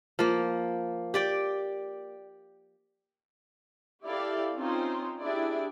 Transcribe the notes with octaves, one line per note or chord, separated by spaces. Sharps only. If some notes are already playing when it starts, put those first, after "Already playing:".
F3 A#3
G4 D5 G5
E4 G4 A4 D5 F5
C4 C#4 D#4 F4 C5
D4 E4 G4 G#4 D5